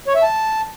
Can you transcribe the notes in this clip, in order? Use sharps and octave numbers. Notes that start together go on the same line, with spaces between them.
C#5
E5
A5